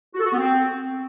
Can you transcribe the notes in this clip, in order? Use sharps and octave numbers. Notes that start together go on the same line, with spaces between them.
F#4
A4
F#4
B3
C4